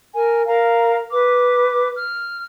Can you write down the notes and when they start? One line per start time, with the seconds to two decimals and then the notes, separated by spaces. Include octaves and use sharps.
0.14 A#4 G#5
0.46 A#4 F5 A#5
1.10 B4 D6
1.94 F6